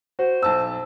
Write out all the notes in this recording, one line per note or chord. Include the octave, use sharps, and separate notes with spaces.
F#4 C5
B1 A5 E6